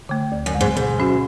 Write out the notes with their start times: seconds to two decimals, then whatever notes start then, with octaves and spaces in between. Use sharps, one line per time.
0.09 D3 A3
0.32 D2
0.46 F#2
0.54 C#3 G#3
0.61 G#2
0.76 G#2 B2
0.99 F#3 C#4 F#4